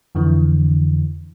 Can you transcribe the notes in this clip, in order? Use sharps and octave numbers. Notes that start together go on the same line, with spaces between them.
F2 D3 E3